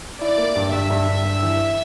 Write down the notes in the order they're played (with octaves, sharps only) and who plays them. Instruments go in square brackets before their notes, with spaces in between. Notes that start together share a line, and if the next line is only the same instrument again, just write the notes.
[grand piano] E4 [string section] D5
[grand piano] A#3
G2
[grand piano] G2 [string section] E5
[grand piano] G2
G2
G2
E3